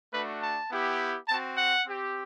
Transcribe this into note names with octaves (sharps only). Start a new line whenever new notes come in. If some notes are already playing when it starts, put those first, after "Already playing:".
A3 D4 F#4 B4
A5
B3 E4 G4
C4 F#4 A5
F#5
C4 G4